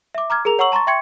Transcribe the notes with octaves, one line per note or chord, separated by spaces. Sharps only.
E5 D6
A#5 D6 F6 G#6
G#4 A#4 A#5 F7
C#5 F#5 A#5 C#6 E6 F#7
A5 A#5 C6 C#6 A6
E5 G5 C6 C#6 G#6 C#7